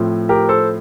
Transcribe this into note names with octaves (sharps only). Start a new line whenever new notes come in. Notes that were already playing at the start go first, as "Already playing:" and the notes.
Already playing: A2 F3 C4
G4 A#4
A4 C5